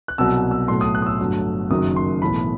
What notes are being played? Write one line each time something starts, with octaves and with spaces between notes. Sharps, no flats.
F#6
C2 B2 F#3 E6
E6
B1 A2 F#3 A3 C6
D#6
F#6
D#6
E6
G1 G2 F#3 A3
F#1 F#2 D#3 F#3 D#6
C6
B1 A2 E3 A3 B5